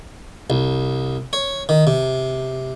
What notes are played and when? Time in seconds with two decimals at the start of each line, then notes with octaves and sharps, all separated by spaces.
0.50 C2
1.33 C#5
1.69 D#3
1.87 C3